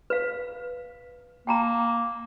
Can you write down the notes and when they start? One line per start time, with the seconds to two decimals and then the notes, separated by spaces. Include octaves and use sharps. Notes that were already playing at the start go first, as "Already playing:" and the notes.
0.10 B4 F5
1.47 A#3 G5 A5 A#5